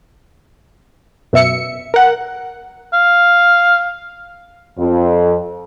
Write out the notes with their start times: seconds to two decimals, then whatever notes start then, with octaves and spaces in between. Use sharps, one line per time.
1.33 F#2 B2 E5 C#7
1.94 A#4 F#5
2.93 F5
4.78 F2